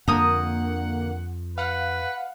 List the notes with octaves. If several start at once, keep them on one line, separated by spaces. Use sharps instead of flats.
F2 D3 A#3 F#5 A#5 D#6
B4 F5 F#5